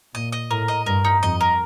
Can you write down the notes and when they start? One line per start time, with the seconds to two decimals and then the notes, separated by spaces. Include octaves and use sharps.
0.14 A#2 D#5
0.32 D#5
0.50 A2 A#4
0.68 D#5
0.86 G2 A#4
1.05 D#4
1.22 F2 D#5
1.41 A#4